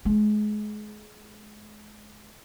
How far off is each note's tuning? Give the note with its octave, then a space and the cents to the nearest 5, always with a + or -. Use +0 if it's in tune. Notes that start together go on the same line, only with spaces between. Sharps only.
G#3 +30